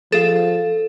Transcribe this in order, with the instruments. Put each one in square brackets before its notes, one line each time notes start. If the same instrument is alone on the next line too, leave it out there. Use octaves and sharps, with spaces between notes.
[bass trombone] F3 [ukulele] G#4 F5 [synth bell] A4